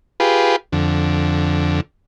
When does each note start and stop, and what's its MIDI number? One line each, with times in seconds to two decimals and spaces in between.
0.20 0.56 65
0.20 0.56 67
0.20 0.56 68
0.20 0.56 71
0.72 1.81 41
0.72 1.81 50